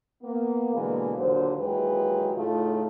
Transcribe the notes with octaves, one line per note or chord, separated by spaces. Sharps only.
A#3 B3
B2 D3 E3 G#3 A#3
D#2 A#2 D3 F#3 C5
D#2 E3 F#3 G#3 G4 B4
A2 C#3 A3 D#4 F4